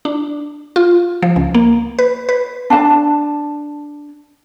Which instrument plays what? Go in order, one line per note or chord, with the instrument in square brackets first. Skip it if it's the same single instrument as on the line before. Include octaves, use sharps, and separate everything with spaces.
[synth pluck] D4
F4
F3
C#2
A#3
B4
B4
[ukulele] D4 A5